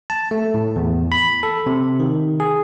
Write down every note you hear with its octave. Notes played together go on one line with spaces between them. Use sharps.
A5
A3
A2
E2
B5
A4
C3
D#3
G#4